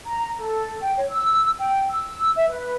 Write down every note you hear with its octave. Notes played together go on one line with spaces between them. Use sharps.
A#5
A4
G5
C#5
E6
G5
E6
E5
B4